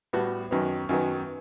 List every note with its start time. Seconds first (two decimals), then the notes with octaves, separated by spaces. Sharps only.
0.13 A2 G3 B3 F#4
0.51 F#2 D#3 F#3 B3
0.89 F#2 D#3 F#3 B3